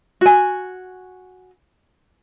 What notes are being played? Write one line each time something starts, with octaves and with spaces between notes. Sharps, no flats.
F#4 G#5